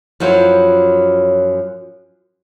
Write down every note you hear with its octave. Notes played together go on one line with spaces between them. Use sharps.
F#2 F3 F#3 E4 F4